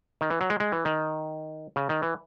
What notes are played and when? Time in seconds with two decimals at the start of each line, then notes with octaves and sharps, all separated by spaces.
0.21 D#3
0.30 E3
0.41 F#3
0.50 G#3
0.60 G#3
0.72 E3
0.85 D#3
1.76 C#3
1.89 D#3
2.02 E3